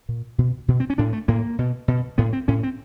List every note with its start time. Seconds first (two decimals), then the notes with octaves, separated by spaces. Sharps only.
0.09 A#2
0.38 B2
0.68 B2
0.80 C4
0.90 C#4
0.98 A2 D4
1.13 A3
1.28 A2 A#3
1.59 B2
1.88 B2
2.18 A2 B3
2.33 C4
2.48 A2 C#4
2.63 C4